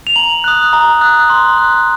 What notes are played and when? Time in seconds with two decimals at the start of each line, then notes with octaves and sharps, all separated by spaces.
0.07 F7
0.16 A#5 F#7
0.44 D#6 F#6
0.73 A#5
1.01 D#6 F#6
1.30 C6
1.58 F#6